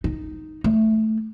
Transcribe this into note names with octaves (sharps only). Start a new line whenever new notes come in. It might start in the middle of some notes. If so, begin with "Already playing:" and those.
D#4
A3